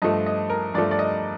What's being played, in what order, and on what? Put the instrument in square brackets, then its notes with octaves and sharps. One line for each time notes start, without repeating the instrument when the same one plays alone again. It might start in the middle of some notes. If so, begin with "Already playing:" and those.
[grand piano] G2 F3 A3 D#5
D#5
A#4
G2 F3 A3 D5
D5
D#5